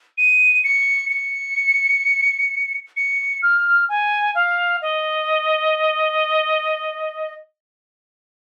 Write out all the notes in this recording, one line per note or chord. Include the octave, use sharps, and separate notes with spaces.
D#7
C#7
C#7
C#7
F6
G#5
F5
D#5